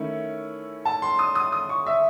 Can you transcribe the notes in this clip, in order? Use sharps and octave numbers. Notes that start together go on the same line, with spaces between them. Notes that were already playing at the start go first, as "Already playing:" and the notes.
Already playing: D#3 A3 C#4 E4
A5
C6
D#6
D#6
D#6
C#6
E5